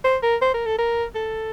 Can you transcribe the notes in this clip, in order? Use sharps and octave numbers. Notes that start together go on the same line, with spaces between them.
C5
A#4
C5
A#4
A4
A#4
A4